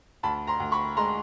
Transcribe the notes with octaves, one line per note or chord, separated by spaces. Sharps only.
D2 A5 B5
A#5 C6
D2
B5 C#6
G#3 A#5 C6